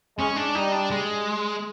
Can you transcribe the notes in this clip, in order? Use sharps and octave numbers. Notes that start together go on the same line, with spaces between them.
G#3 C#4
D4
G3 D#4
D4
G#3